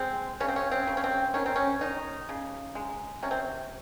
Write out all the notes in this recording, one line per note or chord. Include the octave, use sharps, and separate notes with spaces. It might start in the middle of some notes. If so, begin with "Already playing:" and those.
Already playing: G#3 C4
C#3 C#4
C4
C#4
C4
C#3
C#4
C4
D#3 C#4
C4
C#4
D#3 D#4
C#3
G#3
C3 C#4
C4